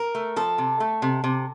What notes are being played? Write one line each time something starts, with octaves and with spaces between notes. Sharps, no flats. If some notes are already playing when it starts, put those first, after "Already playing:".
Already playing: A#4
A3
F3 A4
C3
A3
C3
C3